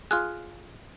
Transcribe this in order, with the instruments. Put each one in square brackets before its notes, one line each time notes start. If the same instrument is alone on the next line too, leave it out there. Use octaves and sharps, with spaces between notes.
[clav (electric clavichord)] F4 G#4 [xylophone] F6 F#6